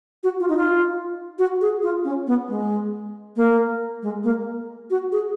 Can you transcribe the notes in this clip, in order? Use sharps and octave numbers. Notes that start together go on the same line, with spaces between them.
F#4
F4
D#4
F4
F#4
G#4
F4
C#4
B3
G#3
A#3
G#3
A#3
F#4
G#4